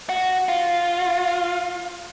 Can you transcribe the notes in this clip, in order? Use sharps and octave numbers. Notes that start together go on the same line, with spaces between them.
F#4
F4